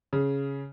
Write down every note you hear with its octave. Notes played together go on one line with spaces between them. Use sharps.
C#3